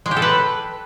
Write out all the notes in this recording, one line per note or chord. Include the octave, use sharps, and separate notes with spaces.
G#3
G4
A4
B4